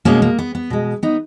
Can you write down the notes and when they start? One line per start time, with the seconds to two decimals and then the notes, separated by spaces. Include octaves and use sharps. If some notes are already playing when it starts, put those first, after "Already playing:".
0.05 B2 G#3 A#3 C#4
0.22 A#3
0.38 B3
0.55 B3
0.70 B2 G#3
1.03 B3 D#4